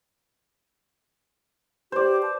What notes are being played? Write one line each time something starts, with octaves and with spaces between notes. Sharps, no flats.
G4 C5 D5
A5